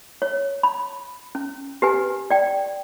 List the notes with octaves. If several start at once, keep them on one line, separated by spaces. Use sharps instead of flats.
C#5
B5
C#4
G4 B4 G#5
D5 G5